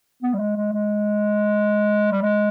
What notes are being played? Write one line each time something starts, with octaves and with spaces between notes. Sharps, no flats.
B3
G3
G#3
G#3
G#3
G3
G#3